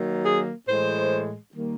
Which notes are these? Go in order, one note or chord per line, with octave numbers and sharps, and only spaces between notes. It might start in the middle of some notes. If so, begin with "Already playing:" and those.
Already playing: D#3 F#3 A#3
G#4
A2 E3 G#3 C5
D#3 G3 A#3